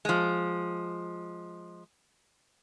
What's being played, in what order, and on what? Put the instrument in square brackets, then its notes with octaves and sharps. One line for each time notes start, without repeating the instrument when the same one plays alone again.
[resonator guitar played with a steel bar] F3 G#3